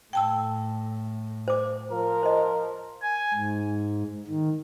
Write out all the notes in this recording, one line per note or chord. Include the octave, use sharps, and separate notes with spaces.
A2 G5 A5 E6
C5 D6
F3 A#4
C5 D#5
G#5
G#2
D#3